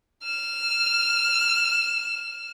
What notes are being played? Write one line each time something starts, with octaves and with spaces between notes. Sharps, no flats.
F6 E7